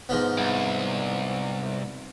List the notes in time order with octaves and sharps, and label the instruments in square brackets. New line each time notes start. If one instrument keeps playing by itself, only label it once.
[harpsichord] G#2 F3 B3
[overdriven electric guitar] C2